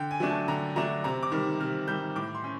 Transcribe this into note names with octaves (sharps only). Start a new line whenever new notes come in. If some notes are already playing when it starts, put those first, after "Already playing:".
Already playing: D3 G5
G#5
F#3 A3 D4
A5
D3 A#5
F#3 A3 D4 A#5
C3 A#5
D6
D#3 G3
C3 F6
D#3 G3 G6
A2 D6
C6
C#4